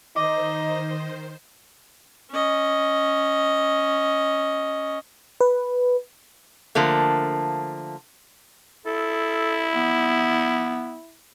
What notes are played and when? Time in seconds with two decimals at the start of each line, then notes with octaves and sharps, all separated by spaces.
0.16 D#3 D#4 C5 D#5 D6
2.32 C#4 D#5
5.41 B4
6.75 D3 F3 A3 A#3
8.86 E4 A4
9.75 B3